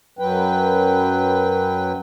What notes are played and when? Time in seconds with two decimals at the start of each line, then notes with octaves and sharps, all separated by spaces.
0.19 F#2 F#3 B4 G5